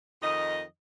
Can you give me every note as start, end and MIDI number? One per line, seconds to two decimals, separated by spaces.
0.22 0.62 41
0.22 0.62 51
0.22 0.62 63
0.22 0.62 75